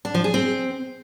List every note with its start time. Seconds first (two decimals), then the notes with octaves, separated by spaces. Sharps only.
0.05 D4
0.14 F3
0.24 G#4
0.34 C4